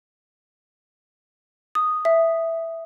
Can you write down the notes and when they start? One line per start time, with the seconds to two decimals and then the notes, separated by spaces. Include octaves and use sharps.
1.75 D#6
2.05 E5